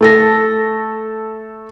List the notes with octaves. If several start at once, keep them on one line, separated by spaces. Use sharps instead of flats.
A3 A4 A#6